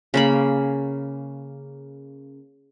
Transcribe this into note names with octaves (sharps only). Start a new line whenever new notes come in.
C#3 A#3 B5